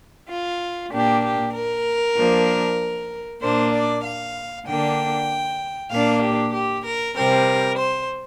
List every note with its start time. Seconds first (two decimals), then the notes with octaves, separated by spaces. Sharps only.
0.29 F4
0.91 A#2 A#3 D4 G4
1.24 G4
1.54 A#4
2.16 F3 A#3 D4
3.42 A#2 A#3 D4 C5
3.73 D5
4.03 F5
4.66 D3 A#3 D4 G5
5.91 A#2 A#3 D4 F5
6.22 G4
6.53 G4
6.85 A#4
7.15 C3 G3 C4 A#4
7.78 C5